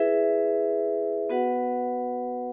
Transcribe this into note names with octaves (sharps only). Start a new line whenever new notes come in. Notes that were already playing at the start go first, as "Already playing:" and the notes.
Already playing: E4 G#4 B4 E5
B3 F#4 B4 F#5